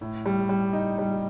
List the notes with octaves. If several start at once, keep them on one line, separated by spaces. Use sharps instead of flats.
A2
G3
G3
D#4
G3